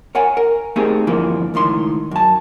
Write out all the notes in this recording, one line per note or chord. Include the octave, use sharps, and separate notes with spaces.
A#4 C#5 F#5 G#5
A#4
A3 A#3 C4 D#4 G4 G#4
G2 D3 E3 F3 A#3
C#2 A2 D#3 C6
F#2 A5